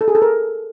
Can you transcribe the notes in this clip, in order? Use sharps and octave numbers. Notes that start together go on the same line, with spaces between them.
A4
G#4
A4
A#4